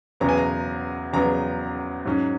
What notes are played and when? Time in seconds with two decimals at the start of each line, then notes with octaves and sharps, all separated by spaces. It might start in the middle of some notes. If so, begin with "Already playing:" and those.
0.20 E2 C#3 F#3 B3 A#5
0.29 G#5
0.38 A#5
1.13 E2 C#3 F#3 B3 A#5
2.05 G#2 F#3 C#4